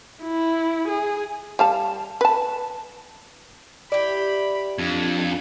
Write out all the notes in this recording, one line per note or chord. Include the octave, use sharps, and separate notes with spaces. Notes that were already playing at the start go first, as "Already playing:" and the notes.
E4
G#4
G3 F5 A5
B4 A5
E4 G4 D5 B5
F2 D4 G#6